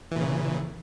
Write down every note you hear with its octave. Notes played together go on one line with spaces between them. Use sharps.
A#2 C#3 E3